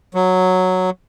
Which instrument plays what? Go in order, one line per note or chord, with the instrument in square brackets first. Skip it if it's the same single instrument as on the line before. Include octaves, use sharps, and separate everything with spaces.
[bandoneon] F#3